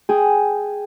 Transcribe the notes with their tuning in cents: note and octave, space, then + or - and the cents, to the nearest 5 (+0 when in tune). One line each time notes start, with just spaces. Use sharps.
G#4 +0 G5 +0